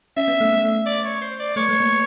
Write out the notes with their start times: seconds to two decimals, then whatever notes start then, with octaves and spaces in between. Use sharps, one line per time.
0.17 C#4 E5
0.28 B3
0.41 A3
0.52 A3
0.86 D5
1.05 C#5
1.21 C5
1.40 D5
1.56 A3 C#5
1.69 A3
1.80 A#3